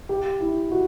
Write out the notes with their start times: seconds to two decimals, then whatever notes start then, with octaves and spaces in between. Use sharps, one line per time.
0.09 G4
0.40 E4
0.71 F#4